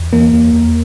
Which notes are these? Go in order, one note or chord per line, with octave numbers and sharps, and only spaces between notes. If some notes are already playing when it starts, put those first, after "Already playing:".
Already playing: E2
E3 A#3 A#4
E2
E2